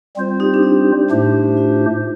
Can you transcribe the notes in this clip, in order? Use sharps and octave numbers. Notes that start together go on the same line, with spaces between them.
G3 C4 F4 C5
D#4 G4
D4
D#4
A2 A3 D4 G4 C5
F4